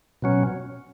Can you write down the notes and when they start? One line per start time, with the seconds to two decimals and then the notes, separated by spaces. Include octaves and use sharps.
0.22 B2 F#3 C#4